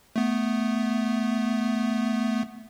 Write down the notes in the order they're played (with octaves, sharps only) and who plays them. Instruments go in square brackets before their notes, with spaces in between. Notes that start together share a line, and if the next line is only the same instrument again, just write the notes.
[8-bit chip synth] A3 B3